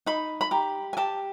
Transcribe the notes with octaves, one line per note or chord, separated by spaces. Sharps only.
D#4 B5
B5
G4 A#5
G#5
G4 A5